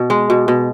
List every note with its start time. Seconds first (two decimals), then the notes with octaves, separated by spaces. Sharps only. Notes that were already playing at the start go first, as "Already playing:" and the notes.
Already playing: B2
0.10 G#3
0.30 B2
0.48 B2